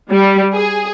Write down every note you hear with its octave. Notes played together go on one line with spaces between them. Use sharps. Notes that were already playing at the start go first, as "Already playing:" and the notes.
G3
G#4